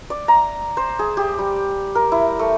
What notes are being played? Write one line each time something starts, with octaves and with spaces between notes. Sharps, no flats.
D5
A#5
C5
G#4
G4
G3
A#4
E4
A3